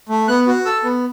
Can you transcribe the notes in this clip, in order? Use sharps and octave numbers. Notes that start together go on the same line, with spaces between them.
A3
B3 F#6
F#4
A4 E6
B3